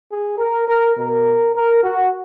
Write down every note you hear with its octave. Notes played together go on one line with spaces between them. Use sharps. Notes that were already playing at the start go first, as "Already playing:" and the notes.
G#4
A#4
A#4
B2 A#4
A#4
F#4